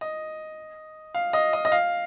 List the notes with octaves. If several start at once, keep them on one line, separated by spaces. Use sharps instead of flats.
D#5
F5
D#5
D#5
D#5
F5